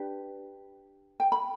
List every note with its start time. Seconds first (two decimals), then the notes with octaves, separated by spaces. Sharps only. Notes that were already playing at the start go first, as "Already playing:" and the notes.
Already playing: D4 G4 B4
1.20 G5
1.32 B5